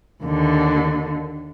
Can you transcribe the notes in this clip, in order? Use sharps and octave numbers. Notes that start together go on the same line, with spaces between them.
D#2 D3